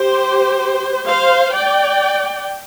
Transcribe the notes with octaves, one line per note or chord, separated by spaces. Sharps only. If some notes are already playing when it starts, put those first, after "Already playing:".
Already playing: G4 C5
C5 F5
D5 G5